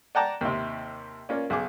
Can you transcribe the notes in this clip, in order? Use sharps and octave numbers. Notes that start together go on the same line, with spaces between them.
D5 F#5 G5 A5 A#5 D6
D#2 C3
A#3 C#4 F4 D5
B1 G#4 D6